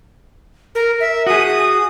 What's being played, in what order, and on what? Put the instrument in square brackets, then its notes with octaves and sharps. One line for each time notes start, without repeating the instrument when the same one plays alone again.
[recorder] A#4
E5
[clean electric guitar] F#4 G#4 [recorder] D#6